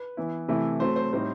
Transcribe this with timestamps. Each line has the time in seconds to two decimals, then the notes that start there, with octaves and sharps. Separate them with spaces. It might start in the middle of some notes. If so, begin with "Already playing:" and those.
Already playing: B4
0.17 E3 B3 E4
0.48 C3 E3 A3 E4
0.80 F#3 A3 C4 C5
0.96 C5
1.13 A2 G3 C4 D#4 C5